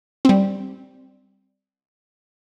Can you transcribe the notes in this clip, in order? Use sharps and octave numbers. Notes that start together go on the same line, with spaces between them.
G3 C4